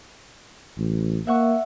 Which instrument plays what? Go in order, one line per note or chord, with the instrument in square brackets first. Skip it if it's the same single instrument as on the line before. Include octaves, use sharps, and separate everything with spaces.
[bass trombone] A1
[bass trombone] A#3 [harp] E5 F#5 C#6